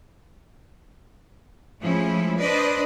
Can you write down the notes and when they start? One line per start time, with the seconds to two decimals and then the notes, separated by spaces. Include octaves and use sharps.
1.81 F3 G#3 A3 C#4 E4
2.39 D4 B4 C5 D5 D#5